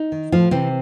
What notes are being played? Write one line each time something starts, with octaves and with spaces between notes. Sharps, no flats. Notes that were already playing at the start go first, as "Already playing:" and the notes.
Already playing: D#4
D#3
A2 F3 F4
C3 E3 C4